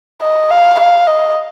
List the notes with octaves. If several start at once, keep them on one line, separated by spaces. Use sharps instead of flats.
D#5
F5
F5
D#5